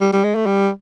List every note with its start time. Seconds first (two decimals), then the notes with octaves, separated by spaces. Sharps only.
0.01 G3
0.13 G3
0.24 G#3
0.35 A3
0.46 G3